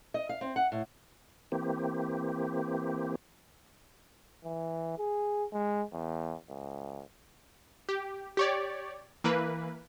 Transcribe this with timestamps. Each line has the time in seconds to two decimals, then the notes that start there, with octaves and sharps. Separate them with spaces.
0.14 D#5
0.29 F5
0.41 C4
0.56 F#5
0.72 A2
1.52 E3 A#3 C4 G4
4.44 E3
4.98 G#4
5.53 G#3
5.93 E2
6.49 C#2
7.89 G4
8.37 G4 C#5 D5
9.24 E3 A#3 B4